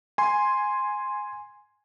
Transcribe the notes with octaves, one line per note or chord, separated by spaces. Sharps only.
G#5 C6